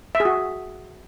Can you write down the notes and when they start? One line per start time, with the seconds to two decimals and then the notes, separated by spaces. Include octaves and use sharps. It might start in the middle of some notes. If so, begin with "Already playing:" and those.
0.15 E5
0.20 G#4
0.25 F#4